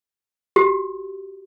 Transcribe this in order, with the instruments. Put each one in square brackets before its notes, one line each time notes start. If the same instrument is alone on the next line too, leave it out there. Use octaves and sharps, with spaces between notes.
[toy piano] F#4 G4